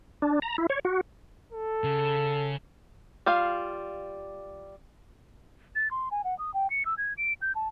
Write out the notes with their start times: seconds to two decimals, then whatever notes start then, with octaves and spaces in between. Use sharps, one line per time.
0.22 D4
0.42 A#5
0.58 E4
0.70 C#5
0.85 F#4
1.53 A4
1.84 C#3
3.26 G3 F4 F5
5.76 A6
5.91 C6
6.11 G#5
6.24 F#5
6.39 D#6
6.54 G5
6.70 C#7
6.86 E6
6.98 G#6
7.18 D7
7.42 G6
7.55 A5